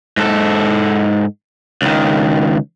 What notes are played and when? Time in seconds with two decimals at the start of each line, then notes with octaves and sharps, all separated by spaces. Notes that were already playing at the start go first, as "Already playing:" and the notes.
0.17 G#2 A4
1.82 C#2 D#3